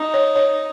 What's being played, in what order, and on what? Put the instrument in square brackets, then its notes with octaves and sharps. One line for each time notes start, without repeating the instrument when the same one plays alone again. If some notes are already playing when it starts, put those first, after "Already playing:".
Already playing: [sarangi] D#4
[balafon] C#5
C#5